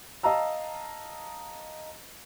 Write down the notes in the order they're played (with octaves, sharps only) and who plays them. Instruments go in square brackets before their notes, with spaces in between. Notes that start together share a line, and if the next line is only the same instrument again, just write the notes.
[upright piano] D#5 F5 A5 A#5 E6